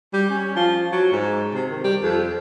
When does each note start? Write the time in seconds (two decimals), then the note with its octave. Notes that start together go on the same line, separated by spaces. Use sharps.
0.13 G3
0.30 C#4
0.56 F3
0.92 F#3
1.12 G#2
1.54 C3
1.70 D#3
1.84 G3
2.03 F2